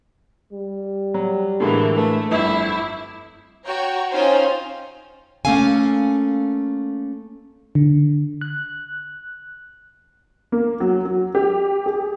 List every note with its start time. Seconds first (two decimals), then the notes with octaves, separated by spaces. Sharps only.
0.52 G3
1.14 F#3
1.60 A2 D3 E3 G#3 A#3
1.96 A3 B4
2.31 G1 F2 E4
3.66 F#4 C#5 G5 A#5 C#6
4.12 C#4 D#4 F4 C5 G5 G#5
5.45 A3 A#3 C#4 A4 F5 G#5
7.75 D3
8.41 F#6
10.52 A#3
10.80 F#3
11.05 F#3
11.35 G4
11.86 G#4